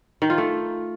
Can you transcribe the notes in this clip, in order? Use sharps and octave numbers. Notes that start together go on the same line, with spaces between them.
D#3
F4
A3